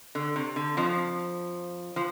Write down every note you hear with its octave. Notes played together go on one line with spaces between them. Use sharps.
D3
C3
D3
F2 F3
F3